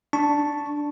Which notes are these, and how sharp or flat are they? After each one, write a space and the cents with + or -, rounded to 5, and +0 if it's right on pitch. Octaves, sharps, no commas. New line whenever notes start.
D4 +0 A5 +0 C#6 +0